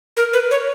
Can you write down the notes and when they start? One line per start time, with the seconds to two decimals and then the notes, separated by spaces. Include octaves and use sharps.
0.17 A#4
0.33 B4
0.51 C#5